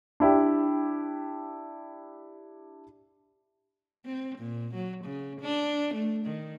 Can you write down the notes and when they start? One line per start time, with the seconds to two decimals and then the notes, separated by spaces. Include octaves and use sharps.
0.20 D4 E4 G4
4.05 C4
4.39 A#2
4.74 F#3
5.04 C#3
5.41 D4
5.94 A3
6.26 D#3